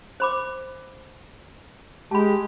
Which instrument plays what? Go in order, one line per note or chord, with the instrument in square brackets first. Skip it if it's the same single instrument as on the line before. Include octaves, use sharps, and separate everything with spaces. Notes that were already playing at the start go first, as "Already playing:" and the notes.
[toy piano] C5 B5 D6
[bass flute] G#3 [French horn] G4 [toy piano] A5 B5